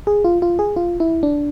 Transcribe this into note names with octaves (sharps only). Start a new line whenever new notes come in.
G#4
F4
F4
G#4
F4
E4
D4